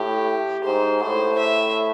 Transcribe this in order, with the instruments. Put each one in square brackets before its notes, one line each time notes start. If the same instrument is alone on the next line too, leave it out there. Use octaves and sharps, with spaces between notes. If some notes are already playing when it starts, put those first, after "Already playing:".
Already playing: [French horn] A2 [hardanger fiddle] G4
[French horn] G#2 [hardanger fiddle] C5
[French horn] A2 [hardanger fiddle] C5
[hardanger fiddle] E5